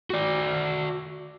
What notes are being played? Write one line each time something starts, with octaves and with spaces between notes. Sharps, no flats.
F#4 D5